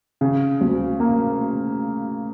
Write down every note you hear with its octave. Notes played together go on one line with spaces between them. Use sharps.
C#3
D2
A#3